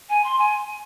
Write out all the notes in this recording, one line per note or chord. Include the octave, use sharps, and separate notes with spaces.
G#5
C6
G#5